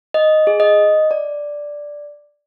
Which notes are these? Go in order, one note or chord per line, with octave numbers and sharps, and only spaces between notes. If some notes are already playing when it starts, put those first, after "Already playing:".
D#5
G#4
D#5
D5